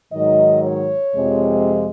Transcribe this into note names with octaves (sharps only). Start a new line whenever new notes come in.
G#2 D#3 F#3 D#5
C#5
F2 C3 F3 G#3